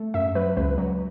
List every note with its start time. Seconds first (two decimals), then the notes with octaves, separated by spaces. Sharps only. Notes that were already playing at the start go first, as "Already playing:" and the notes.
Already playing: A3
0.14 F#2 E5
0.35 F#3 B4
0.57 C#2 B4
0.78 F#3